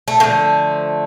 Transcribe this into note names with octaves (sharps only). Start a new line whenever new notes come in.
A3
D3 F3 A3 A#3